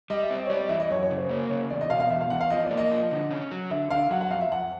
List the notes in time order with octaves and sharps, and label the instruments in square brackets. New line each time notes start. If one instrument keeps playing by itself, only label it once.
[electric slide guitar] G3 [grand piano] D#5
[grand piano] E5
[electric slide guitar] C4
[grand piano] D#5
C#5
[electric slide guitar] G3 [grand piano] D5
[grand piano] D#5
[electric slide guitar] E3 [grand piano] E5
[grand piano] D#5
[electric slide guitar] F#2 [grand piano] C#5
[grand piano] C#5
[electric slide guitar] C#3
[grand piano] C5
[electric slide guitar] A#3 [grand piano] C#5
[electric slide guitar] C#3 [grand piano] C#5
[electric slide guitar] E2 [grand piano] D5
[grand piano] D#5
[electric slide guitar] B2 [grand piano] F5
[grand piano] F5
[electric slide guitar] E2 [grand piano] E5
[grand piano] F5
[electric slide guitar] E2 [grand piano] F#5
[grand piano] F5
[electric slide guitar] F3 [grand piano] D#5
[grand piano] D5
[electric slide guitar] A#3
[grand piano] D#5
[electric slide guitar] F3
D3
C#4
F#3
[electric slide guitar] D3 [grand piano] E5
[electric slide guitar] D3 [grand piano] F5
[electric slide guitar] F#3 [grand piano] F#5
[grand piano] F#5
[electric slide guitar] F2 [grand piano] F5
[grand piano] E5
[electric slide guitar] F2 [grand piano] F#5